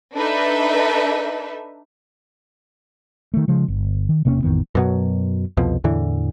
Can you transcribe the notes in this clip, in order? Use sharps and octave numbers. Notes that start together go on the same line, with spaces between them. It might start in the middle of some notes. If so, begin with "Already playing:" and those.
D4 D#4 A4 B4 E5
D#3 A3
C#3 F3 G#3
G1
D#3
E1 C3 A#3 C#4
A1 F2 D#3 B3
F#2 B2 F#3
C2 F2 B2 F3
E2 A2 D3 E3